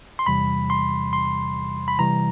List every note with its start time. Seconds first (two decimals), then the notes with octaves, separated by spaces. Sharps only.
0.19 C6
0.26 E2 C3 E3 G3 B5
0.70 C6
1.13 C6
1.88 B5
1.99 C3 E3 G3 A#5